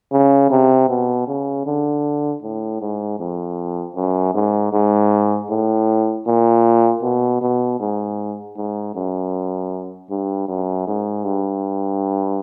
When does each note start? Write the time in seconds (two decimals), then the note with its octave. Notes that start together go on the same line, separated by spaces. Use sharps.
0.12 C#3
0.51 C3
0.89 B2
1.27 C#3
1.66 D3
2.42 A2
2.81 G#2
3.19 F2
3.95 F#2
4.35 G#2
4.73 G#2
5.50 A2
6.27 A#2
7.03 B2
7.42 B2
7.80 G#2
8.57 G#2
8.95 F#2
10.10 G2
10.48 F#2
10.87 G#2
11.25 G2